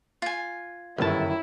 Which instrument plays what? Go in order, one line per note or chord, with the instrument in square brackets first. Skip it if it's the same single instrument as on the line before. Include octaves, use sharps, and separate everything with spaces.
[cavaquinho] F4 G#5
[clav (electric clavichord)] G1 A5 [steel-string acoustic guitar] F#2 D#3 [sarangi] E4